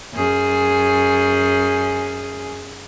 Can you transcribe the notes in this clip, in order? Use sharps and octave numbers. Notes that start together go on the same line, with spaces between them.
F#2 G#4